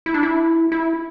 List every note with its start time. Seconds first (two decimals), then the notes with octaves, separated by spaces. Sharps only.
0.06 E4
0.14 D4
0.23 E4
0.72 E4